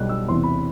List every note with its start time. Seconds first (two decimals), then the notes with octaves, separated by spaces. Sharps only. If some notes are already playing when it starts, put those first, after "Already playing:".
Already playing: B1 B2 G3 F#6
0.09 E6
0.28 E2 C3 E3 C6
0.43 B5